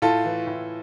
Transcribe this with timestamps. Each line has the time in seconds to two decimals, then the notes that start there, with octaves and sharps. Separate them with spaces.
0.02 A2 F4 A4
0.25 E3
0.47 A2